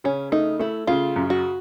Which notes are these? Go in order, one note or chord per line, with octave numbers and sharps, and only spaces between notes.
C#3 C#4
A3 D#4
A3 E4
C#3 F4
F#2
F#4